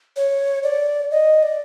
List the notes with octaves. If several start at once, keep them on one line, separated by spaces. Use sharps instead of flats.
C#5
D5
D#5
D5